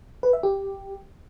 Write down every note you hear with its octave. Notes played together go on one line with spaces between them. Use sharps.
B4
E5
G4